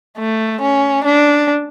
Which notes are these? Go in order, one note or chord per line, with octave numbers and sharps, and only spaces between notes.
A3
C#4
D4